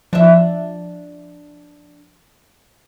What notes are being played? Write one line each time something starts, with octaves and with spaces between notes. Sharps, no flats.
F3 D4 E5